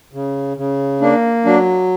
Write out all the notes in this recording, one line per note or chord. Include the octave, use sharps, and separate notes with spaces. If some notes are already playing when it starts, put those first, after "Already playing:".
C#3
C#3
A#3 D4
F#3 D4